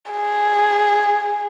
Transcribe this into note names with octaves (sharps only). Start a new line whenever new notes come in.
G#4